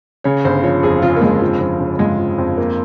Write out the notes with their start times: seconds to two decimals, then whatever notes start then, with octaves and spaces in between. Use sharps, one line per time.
0.24 C#3 C#5
0.44 G1 C5
0.63 F3 C#5
0.83 F2 G#4
1.02 C#3 F4
1.16 A#3
1.21 G1 G#3
1.42 F3
1.60 F2
1.80 C#3
1.99 G1 G#3
2.19 F3
2.38 F2
2.58 A#3